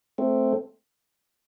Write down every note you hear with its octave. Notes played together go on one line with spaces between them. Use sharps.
A3 C4